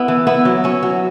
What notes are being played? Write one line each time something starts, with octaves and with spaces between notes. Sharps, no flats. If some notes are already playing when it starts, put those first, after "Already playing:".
Already playing: B3 E4
E3
B3 E4
F#3
C#4 E4
F#3